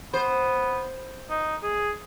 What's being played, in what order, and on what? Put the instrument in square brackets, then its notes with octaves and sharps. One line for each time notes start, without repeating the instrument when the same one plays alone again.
[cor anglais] B3 [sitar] C5
[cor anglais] D#4
G#4